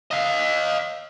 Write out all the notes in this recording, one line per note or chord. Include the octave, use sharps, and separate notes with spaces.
D#5 F5